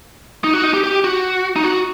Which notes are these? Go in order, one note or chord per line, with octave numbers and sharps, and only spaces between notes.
D#4
F#4
D#4
G4
G4
F#4
D#4
F#4